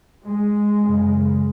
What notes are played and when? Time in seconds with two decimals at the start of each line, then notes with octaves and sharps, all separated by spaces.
0.26 G#3
0.78 F#2
0.84 C#3